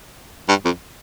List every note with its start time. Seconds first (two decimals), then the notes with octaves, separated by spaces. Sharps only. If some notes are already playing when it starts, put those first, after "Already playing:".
0.49 G2
0.65 F2